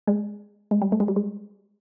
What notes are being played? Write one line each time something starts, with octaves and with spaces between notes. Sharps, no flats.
G#3
G#3
G3
A3
G#3
G3
G#3